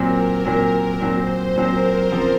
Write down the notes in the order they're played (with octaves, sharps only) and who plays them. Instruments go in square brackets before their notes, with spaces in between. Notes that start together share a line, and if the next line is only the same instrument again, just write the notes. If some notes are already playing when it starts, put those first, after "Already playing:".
Already playing: [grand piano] A#2 F#3 C4 [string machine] A#4
[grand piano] A#2 F#3 C4
[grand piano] A#2 F#3 C4 [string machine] C5
[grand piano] A#2 F#3 C4 [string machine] A#4
[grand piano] C#3 F3 C4